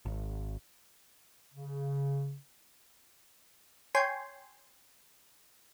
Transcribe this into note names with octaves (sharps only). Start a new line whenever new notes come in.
G#1
C#3
C#5 G5 G#5 C6